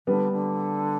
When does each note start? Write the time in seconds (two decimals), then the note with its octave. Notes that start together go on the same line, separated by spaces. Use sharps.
0.07 D3 G3 B3
0.33 D3